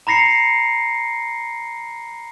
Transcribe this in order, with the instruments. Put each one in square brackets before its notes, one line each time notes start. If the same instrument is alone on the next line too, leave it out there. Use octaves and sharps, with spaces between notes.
[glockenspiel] A#5 B5 A#6 C7 C#7